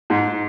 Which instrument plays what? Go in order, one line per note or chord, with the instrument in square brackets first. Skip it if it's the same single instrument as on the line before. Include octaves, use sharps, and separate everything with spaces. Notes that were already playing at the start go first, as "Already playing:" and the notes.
[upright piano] G#2